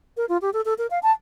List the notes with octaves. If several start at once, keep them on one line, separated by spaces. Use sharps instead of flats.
A#4
F4
G4
A4
A4
A#4
F5
A5